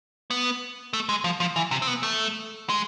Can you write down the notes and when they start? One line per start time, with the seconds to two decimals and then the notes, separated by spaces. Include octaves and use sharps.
0.30 B3
0.93 A3
1.09 G#3
1.24 F3
1.40 F3
1.56 E3
1.71 C3
1.82 C4
1.87 B3
2.03 A3
2.69 G#3